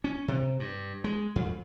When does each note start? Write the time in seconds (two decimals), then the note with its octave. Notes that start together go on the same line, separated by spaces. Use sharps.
0.04 C#4
0.28 C3
0.60 G2
1.04 G#3
1.36 F2